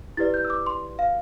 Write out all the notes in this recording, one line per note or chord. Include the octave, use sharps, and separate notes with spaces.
E4 G4 B4 D5 A6
G6
E6
D6
C6
F5